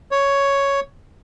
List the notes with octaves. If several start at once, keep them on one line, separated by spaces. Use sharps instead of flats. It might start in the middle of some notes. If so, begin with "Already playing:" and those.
C#5